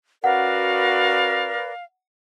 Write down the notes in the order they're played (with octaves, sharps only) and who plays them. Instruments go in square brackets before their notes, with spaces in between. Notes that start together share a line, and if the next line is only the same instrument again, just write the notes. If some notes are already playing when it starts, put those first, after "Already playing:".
[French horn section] C#4 F#4 [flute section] A#4 B4 D5 [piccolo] F5 [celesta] F#5